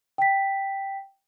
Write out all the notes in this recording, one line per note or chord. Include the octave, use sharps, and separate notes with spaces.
G5 B6